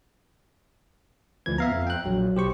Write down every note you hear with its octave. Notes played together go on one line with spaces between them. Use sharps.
D2 E3 F3 G#6
B3 E5 F5 A#5
F2
G5 F#6
A#1 F#3
B1 G4 C5 C#6